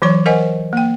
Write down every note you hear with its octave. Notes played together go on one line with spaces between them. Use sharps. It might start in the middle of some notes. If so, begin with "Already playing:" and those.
E3 F#3 C#5 C#6
A#4 C5 D#5 F#5 G#5
A#3 G5